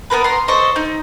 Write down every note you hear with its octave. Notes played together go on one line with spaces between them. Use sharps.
B3 C4 A#4 B4
A#5 C6
A4 C5 D#5 C#6
D#4